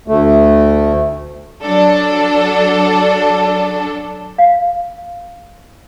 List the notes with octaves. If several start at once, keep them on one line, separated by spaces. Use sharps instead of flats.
D2 A3
F#3 D4 A4
F5